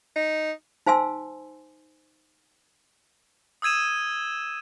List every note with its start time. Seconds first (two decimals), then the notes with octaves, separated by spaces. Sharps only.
0.16 D#4
0.86 D#4 C5 F5 G#5 C6 E6
3.62 D#6 E6 G#6 D#7 E7